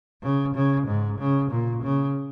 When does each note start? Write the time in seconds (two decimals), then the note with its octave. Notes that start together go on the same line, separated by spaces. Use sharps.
0.23 C#3
0.55 C#3
0.87 G#2
1.19 C#3
1.51 A#2
1.83 C#3